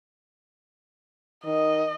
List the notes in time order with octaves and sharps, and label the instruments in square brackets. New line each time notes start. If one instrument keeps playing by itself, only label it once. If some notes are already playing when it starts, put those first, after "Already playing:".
[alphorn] D#3 [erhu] D#5